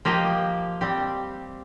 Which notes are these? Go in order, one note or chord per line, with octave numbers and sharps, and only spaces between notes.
F3 A#3 G4 D#5
G3 C4 G4